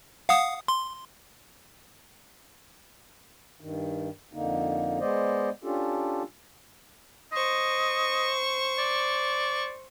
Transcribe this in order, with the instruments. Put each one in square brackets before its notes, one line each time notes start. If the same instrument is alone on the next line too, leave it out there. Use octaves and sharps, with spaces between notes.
[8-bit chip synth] F5 F#5 D#6
C6
[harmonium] G2 D#3
F2 D3 A#3 D#4
G#3 B3 C5 D5 D#5
C#4 D4 F4 G4 A4
[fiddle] C5 C#6 [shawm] D#5
[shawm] D5